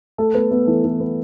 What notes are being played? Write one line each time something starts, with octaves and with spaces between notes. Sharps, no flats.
A3 A4
A3 B3 B4
A3 B3 B4
E3 A4
E3 A4
B3 B4